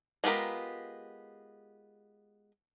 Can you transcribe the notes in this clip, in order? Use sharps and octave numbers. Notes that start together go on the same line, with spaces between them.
G#3 B3 F4 G4 A#4